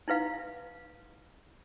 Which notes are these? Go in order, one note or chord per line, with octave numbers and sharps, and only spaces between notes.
D#4 E4 B4 F5